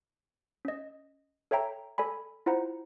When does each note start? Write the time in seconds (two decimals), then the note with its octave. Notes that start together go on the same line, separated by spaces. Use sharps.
0.65 C#4 D#5
1.51 A4 C#5 E5 G5 A#5
1.98 A4 D5 G#5 B5
2.46 E4 F4 C5 F#5 A#5